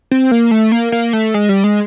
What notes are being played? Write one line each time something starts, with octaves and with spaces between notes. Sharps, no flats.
C4
A#3
A3
A#3
A#3
A3
G#3
G3
G#3